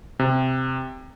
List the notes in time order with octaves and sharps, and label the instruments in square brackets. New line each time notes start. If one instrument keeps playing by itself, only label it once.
[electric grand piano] C3